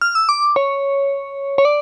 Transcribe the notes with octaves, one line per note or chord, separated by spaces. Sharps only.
F6
E6
D6
C#5
C#5
D5